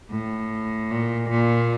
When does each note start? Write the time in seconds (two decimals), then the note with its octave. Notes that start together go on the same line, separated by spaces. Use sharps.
0.11 A2
0.91 A#2
1.29 A#2